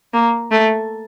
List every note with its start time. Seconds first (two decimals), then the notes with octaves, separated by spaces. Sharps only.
0.13 A#3
0.51 A3